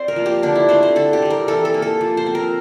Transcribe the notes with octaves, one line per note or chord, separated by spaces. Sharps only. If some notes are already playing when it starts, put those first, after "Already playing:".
Already playing: C4 C5 D5
A#4
F3 A#3
G4
D3 D4
E4
A3 C4 C5
C5
D3 A4
G4
G3 C4
A#4
E3 A4
A4
A#3
A4
F3
C5
C4
A#4